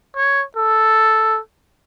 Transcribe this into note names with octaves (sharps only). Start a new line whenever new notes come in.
C#5
A4